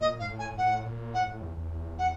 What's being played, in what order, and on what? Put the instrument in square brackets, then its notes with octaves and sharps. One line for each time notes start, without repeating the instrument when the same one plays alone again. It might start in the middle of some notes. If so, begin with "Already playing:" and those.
[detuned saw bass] A#2 [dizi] D#5
[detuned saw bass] G#2 [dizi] F5
[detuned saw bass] A2
[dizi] G#5
[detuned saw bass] A2 [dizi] F#5
[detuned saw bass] A#2
[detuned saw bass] A2 [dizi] F#5
[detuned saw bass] A2
E2
E2
[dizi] F#5